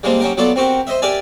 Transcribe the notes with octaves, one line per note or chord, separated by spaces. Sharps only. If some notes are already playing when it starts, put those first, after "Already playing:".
G3 G#3 A#3 C4 D4
F#3 C#4 G4 A#4
F#3 B3 F4 A4 D5
C4 F#4 G4 A#4
C5 D#5 E5
G4 A#4 D5 E5 G#5